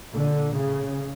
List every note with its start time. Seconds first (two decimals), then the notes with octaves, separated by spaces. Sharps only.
0.13 A#2 D3
0.53 A2 C#3